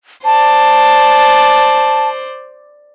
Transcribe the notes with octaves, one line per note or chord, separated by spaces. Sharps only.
C5 D5 A5